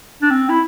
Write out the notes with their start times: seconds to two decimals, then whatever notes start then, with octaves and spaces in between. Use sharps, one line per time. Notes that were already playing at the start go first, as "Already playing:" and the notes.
0.22 D4
0.30 C4
0.49 E4